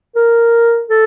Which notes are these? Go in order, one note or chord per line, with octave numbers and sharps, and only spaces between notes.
A#4
A4